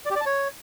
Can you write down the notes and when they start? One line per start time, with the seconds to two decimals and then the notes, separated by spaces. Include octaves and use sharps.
0.06 D5
0.11 G4
0.16 D5
0.21 A5
0.26 C#5